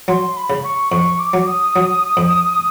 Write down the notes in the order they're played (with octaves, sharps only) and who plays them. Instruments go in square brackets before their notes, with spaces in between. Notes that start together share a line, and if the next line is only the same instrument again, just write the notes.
[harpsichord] F#3 [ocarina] C6
[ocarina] B5
[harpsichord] C#3
[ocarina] C#6
[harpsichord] F2 [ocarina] C#6
[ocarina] D6
[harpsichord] F#3
[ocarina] D#6
[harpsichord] F#3
F2